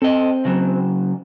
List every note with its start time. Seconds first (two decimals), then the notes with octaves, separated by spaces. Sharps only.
0.02 C4 A4 D#5
0.45 C#3 F#3